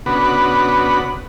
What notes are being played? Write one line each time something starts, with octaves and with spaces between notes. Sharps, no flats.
C#3 B3 D4 F#4 B4 F#5